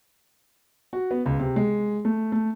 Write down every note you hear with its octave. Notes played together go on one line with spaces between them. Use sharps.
F#4
B3
C#2
C3
G#3
A3
A3